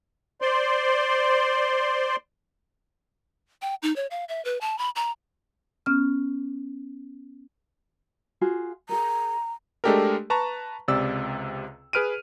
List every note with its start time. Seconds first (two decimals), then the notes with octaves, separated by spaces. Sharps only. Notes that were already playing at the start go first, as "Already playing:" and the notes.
0.42 C5 D5 C6
3.62 G5
3.83 D#4
3.96 C#5
4.11 F5
4.29 E5
4.45 B4
4.61 A5
4.78 B5
4.96 A#5
5.86 B3 C#4 F6
8.41 F4 F#4 G#4
8.89 G#4 A#4 A#5
9.84 G#3 A3 D4 G4 A4 A#4
10.30 B4 A5 A#5 C#6
10.88 C#2 C3 D5 E6
11.93 G#4 B4 F6 D7 D#7